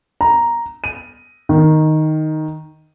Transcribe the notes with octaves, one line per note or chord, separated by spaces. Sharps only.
A#5
D#7
D#3